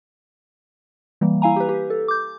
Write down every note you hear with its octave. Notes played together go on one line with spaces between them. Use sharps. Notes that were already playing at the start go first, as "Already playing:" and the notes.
E3 G3 A#3
E4 F5 G#5 A#5
G4 B4
G4
A4
D6 G6